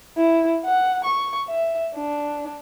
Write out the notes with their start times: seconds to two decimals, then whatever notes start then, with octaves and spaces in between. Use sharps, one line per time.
0.17 E4
0.65 F#5
1.04 C#6
1.48 E5
1.95 D4